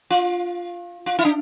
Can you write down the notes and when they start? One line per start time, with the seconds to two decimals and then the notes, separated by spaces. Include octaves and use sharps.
0.10 F4
1.06 F4
1.19 E4
1.25 D4